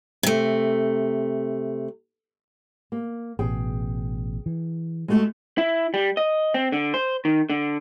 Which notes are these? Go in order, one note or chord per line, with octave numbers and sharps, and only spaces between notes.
C3 A3
A#3
A1 B2 G#4 G5
E3
G#3 A3 F#4
E4
G3
D#5
C4
D3
C5
D#3
D3